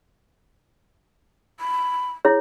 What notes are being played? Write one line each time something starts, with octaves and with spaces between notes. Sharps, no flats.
B5
E4 G#4 C#5